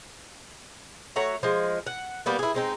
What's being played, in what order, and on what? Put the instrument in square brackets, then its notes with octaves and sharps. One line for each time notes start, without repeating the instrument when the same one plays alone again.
[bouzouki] A3 F#4 C#5 A#5
F3 G#3
F#5
G3 A#3 B3
E4 G#4
G#3 C4 D#4